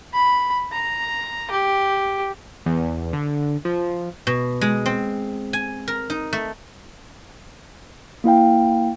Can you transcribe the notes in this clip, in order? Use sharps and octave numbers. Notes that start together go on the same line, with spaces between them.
B5
A#5
G4
E2
D3
F3
B2
G#3
C4
G#5
A#4
D#4
A3
A#3 E4 F5 G5